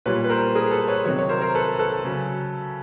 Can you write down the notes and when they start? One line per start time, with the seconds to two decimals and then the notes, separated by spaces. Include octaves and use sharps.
0.06 A#2 G3 B4 C#5
0.24 B4
0.30 A#4 C5
0.55 G#4 A#4
0.71 A4 B4
0.88 B4 C#5
1.04 C3 D#3 F#3 B4 C#5
1.19 C#5
1.29 A#4 C5
1.42 A#4 C5
1.55 A4 B4
1.79 A4 B4
2.05 C#3 F#3